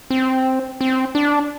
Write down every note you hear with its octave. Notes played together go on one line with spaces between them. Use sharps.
C4
C4
D4